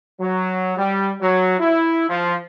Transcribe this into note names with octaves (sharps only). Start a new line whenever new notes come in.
F#3
G3
F#3
E4
F3